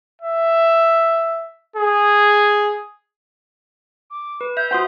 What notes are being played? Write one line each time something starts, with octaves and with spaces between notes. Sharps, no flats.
E5
G#4
D6
B4
E5 G6
F#4 C5 F#5 C6 D#6